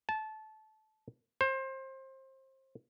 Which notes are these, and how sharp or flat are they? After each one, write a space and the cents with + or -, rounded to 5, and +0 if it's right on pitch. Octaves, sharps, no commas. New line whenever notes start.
A5 -20
C5 +25